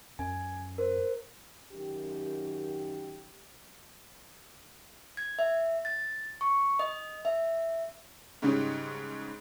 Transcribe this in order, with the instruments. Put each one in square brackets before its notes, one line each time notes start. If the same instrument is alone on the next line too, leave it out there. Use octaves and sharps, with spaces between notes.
[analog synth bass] F#2 [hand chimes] G#5
[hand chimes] A#4 C5
[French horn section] F#2 D#3 G4
[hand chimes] G#6
E5
A6
C#6
D#5
E5
[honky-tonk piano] G#2 C#3 G3 C#4 D#4